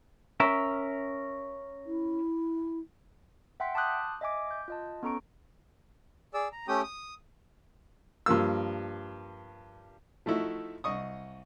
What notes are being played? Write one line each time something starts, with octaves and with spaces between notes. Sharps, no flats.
C#4 A#4 E5
E4
E5 F#5 G5 C6 B6
A5 C6 D6 D#6 F#6 G6
D#5 E5 G#5 D6
G6
F4 D#5 A5
B3 C#4 A4 A#5 C#6 D7
G#4 D5 E6
A#5
A3 C#4 G4 G5 D#6
D#6
G2 F3 A#3 E6
F3 A3 D#4 E4 F#4
C2 D#5 C#6 D#6